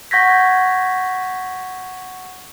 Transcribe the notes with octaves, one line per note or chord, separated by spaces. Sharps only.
F#5 C#6 G6 G#6 A#6 B6